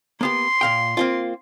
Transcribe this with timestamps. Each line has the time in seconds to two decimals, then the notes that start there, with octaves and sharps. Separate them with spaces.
0.21 A#3 B3 G4 C6
0.61 A#2 F5 G5
0.97 A#3 C4 F4